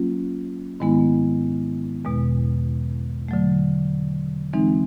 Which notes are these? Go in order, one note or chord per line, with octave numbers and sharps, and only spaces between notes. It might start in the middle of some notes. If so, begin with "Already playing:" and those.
Already playing: F#3 A#3 C#4 F4
G#2 D#3 G#3 B3 E4
E2 B2 G#3
D3 F#3 A3
E3 G#3 C4 D#4